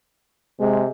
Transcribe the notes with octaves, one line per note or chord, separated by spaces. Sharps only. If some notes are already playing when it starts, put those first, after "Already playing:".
C3 G#3